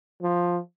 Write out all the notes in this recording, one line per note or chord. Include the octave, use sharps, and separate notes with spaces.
F3